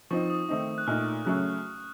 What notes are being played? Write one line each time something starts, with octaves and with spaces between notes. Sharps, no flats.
F3 C4 D#4 C#6
D#6
D#3 A3 C4 D#4
F#6
A#2 A3 D#4 F6
C#3 F#3 A3 C#4 F#6